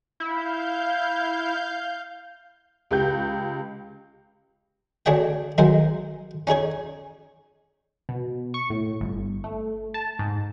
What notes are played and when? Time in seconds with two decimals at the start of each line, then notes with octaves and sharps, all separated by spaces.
0.20 E4 F5 G6
2.91 C#2 G4 G6
5.06 D2 D4 G#4 C#5 D#5 G5
5.58 D#3 F#3 G#3 D#4 C5
6.47 C#4 D#4 G#4 C#5
8.09 B2
8.54 C#6
8.70 A2
9.01 G1
9.44 A3
9.94 A5
10.19 G#2